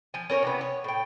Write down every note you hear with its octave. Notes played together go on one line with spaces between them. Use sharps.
F3 G#5
C#4 A#4 C5 C#5
C3 E3 B3
C#5
A2 G5